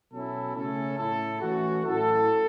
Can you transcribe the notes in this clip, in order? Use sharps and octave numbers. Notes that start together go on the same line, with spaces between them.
B2 F#3 C#4 E4 A4
C#3 A3 C#4 A4
A2 A3 E4 A4
E3 A3 C#4 F#4
A2 F#3 C#4 E4 A4